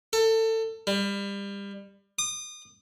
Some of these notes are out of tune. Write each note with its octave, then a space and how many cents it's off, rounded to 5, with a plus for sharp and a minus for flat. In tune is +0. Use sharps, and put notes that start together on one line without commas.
A4 +25
G3 +30
D#6 -35